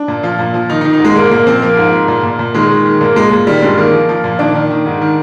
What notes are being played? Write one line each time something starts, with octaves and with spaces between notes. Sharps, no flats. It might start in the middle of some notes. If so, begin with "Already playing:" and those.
Already playing: D4
A#2
F3 F4
A#2
F3
D#3 D#4
D#4
D#3
D#4
G#2 G#3
A#2 A#3
A#2 A#3
F3 C4
F3 A#3
G#2
G#2
A#2
A#2
A#2
D#3 G#3
D#3
D#3
A#2 A#3
A#2 G#3
A#2
D#3 G3
G2 G#3
D#3 A#3
F3
F3
A#2
D#3 D4
D#3
D#3
G#2
D#3